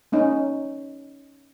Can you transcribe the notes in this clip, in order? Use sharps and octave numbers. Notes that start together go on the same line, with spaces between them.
A#3 C#4 D#4